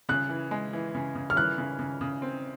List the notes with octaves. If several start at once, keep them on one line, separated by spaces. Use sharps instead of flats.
C#3 F#6
E3
G#3
E3
C#3
C#3
F6
E3 F#6
C#3
C#3
C#3
C4